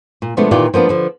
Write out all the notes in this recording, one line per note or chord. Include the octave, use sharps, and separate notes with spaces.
A#2
B2 F3 G#3 A3 B3 D4
A#2 D#3 E3 F4 G4 D5
F3 A#3 B3 D4
D3 F3